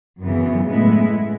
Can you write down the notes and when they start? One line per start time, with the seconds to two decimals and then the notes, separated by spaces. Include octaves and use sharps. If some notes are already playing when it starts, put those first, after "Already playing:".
0.22 F#2 C#3 E3 B3
0.66 A2 G#3 B3 E4